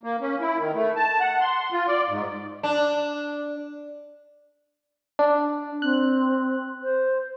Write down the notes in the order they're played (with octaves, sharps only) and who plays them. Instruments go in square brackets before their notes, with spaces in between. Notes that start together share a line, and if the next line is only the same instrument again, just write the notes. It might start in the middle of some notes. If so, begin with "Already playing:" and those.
[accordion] A#3
C#4
E4
D#3
A3
A5
F#5
C6
F4
D5
G#2
[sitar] D4
[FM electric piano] D4
[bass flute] C4 [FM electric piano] F#6
[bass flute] C5